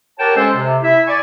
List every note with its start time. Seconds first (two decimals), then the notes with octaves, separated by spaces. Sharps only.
0.19 G4 A#4 C#5 F#5 G5 A5
0.36 G#3 C#4 A4 C5
0.55 C3
0.82 E4 E5
1.06 D5 G#5 C#6